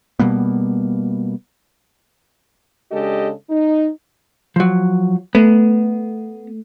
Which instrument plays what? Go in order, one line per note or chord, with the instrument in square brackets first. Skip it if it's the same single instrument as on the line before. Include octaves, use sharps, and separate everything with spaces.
[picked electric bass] B2 G3 A#3 B3
[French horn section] C#3 G#3 D4 G4 A4 D#5
D#4
[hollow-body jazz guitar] F3 F#3
[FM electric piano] A3 [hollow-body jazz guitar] B3